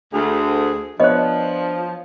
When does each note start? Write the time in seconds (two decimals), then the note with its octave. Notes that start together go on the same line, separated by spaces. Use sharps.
0.13 D2 G#4
1.00 F3 B3 D4 C5 C#5 D#5